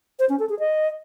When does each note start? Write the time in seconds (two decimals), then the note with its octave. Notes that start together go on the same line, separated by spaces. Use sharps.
0.19 C5
0.29 C#4
0.39 A4
0.49 G#4
0.59 D#5